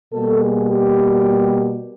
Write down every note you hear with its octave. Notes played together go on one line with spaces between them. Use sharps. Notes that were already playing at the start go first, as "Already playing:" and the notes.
B2 G3 A#3 A4
G#4
G4